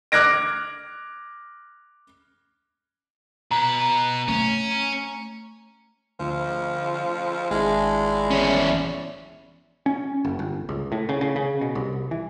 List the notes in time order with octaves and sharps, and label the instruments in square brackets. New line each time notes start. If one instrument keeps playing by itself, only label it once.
[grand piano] D6 F6 F#6 G#6 A#6 D7
[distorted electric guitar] B2 B4 [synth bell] A#5
[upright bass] A3 [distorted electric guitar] C#4
[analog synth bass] D2 [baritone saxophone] F3
[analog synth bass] G#1 [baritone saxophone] G#3 [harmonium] D4 E4
[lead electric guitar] E2 C#4
[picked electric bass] C#4
F#1
G1
C#2
A2
C#3
C#3
C#3
B2
C2
E3